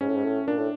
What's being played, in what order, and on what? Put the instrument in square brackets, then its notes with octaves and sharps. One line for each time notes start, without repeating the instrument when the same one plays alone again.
[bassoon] G#2 [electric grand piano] C#4
[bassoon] A2
G#2
A2
[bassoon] A#2 [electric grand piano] D4
[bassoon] A2